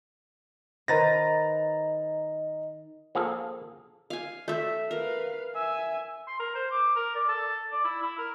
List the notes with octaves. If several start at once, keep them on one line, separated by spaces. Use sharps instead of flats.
D#3 B4 C5 D#5 A#5 A6 A#6
F3 A#3 G#4 A4
F5 G#5
A3 E5
A#4 B4 F5
E5 G#5
C6
A#4
C5
D6
A#4
D5
A4
D5
E4
E4
A#4